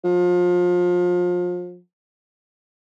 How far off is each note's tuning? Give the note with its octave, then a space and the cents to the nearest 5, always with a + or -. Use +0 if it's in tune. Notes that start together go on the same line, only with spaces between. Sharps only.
F3 +30